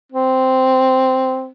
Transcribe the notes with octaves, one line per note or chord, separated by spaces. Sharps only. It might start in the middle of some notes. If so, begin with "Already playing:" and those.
C4